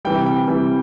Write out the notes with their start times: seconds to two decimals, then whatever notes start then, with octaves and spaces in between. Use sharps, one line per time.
0.05 C3 E3 G3 G5
0.26 G5
0.48 C3 E3 G3